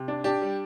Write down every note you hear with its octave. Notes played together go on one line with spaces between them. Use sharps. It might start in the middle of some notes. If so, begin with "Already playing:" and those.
Already playing: C3
D4
D4 G4
G3